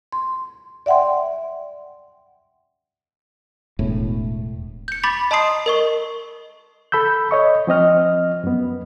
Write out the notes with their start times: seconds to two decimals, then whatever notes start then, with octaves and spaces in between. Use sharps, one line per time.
0.12 C6
0.86 D5 E5 F#5 G5 C6
3.79 E1 A2
4.88 G6 C#7
5.03 B5 D6 A6 B6 F#7
5.31 D#5 A5 A#5 C6 D#6 C7
5.66 A#4 D#5 C#6
6.92 A4 B5 E6 G6
7.31 C#5 D#5 C#6
7.67 F3 C4 D#5 F6
8.44 F#2 B3